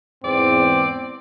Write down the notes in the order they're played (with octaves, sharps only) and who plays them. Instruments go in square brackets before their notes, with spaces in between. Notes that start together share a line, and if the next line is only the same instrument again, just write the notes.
[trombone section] E2 G#2 [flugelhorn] C4 [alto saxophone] D5